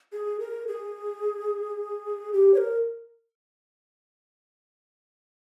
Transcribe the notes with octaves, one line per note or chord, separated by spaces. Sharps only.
G#4
A#4
G#4
G4
C#5
A#4